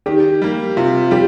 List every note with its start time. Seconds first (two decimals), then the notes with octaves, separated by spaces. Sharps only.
0.06 D#3 G4
0.42 G3 A#3
0.77 C3 F4
1.11 G3 G4